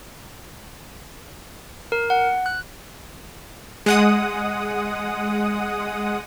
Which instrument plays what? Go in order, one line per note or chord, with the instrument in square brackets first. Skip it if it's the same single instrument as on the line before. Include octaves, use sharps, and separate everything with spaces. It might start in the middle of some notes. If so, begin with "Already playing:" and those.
[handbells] A#4
F#5
F#6
[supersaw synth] G#3 F#5 D#6